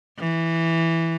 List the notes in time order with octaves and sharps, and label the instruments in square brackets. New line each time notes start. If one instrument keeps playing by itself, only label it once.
[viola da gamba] E3